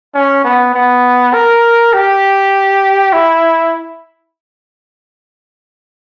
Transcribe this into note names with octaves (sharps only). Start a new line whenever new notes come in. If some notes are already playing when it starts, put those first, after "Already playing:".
C#4
B3
B3
A#4
G4
E4